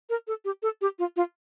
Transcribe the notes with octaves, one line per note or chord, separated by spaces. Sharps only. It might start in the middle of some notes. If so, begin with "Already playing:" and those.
A#4
A4
G4
A4
G4
F4
F4